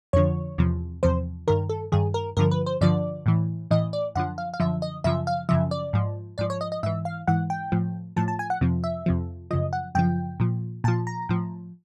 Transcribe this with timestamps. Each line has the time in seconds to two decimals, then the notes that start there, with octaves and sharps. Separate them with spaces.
0.13 F2 D3 F3 C#5
0.58 E2 C3 F3
1.03 E2 C3 F3 C5
1.48 G2 D#3 A#4
1.69 A4
1.92 G2 D#3 G#4
2.14 A#4
2.37 G2 D3 F3 A#4
2.51 B4
2.66 C5
2.81 G2 D3 F3 D5
3.26 A2 E3
3.71 A2 E3 D#5
3.93 D5
4.15 F#2 D3 F3 F#5
4.38 F5
4.54 F5
4.60 F#2 D3 F3 E5
4.82 D#5
5.04 F#2 C#3 F3 E5
5.27 F5
5.49 F#2 C#3 F3 E5
5.71 D5
5.93 G#2 F3
6.38 G#2 F3 D5
6.50 C#5
6.61 D#5
6.72 D#5
6.83 G#2 E3 E5
7.05 F5
7.28 G#2 E3 F#5
7.50 G5
7.72 A2 F3
8.16 A2 F3 A5
8.28 A5
8.39 G#5
8.50 F#5
8.61 F2 C3 F3
8.84 E5
9.06 F2 C3 F3
9.51 F#2 C#3 F3 D#5
9.73 F#5
9.95 F#2 C#3 F3 G5
10.40 A#2 F3
10.84 A#2 F3 A5
11.07 A#5
11.29 A2 F3